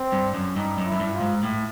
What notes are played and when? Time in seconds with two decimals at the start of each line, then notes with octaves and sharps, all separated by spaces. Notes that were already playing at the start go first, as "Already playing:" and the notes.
Already playing: C4
0.12 G2
0.34 F#2
0.56 G2 D#4
0.78 F#2
0.85 E4
0.92 F#2
1.00 G2
1.14 F4
1.20 G#2
1.43 A2